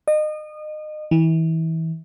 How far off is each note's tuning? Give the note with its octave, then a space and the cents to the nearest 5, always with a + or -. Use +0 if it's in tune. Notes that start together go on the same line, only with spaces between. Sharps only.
D#5 -30
E3 -30